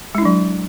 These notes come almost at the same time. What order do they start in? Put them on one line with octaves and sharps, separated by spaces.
G#3 E4 D4 F#3